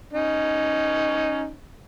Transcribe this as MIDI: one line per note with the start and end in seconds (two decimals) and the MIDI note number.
0.13 1.52 61
0.13 1.52 63